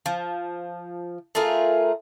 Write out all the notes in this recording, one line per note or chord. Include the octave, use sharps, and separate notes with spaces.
F3
A3 F4 G#4 A#4